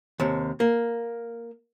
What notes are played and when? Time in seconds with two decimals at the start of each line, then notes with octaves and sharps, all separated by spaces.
0.20 D#2 C3
0.60 A#3